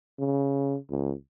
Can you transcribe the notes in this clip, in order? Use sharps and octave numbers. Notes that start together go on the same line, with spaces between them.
C#3
C#2